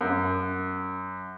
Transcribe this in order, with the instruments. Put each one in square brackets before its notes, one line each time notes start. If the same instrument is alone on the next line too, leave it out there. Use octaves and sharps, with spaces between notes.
[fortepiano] F#2